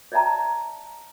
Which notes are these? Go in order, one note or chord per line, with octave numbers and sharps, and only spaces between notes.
C#5 D5 E5 G5 A5 A#5